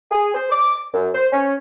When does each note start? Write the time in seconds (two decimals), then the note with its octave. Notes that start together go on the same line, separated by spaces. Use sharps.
0.11 G#4
0.34 C5
0.51 D6
0.94 F#2
1.15 C5
1.33 C#4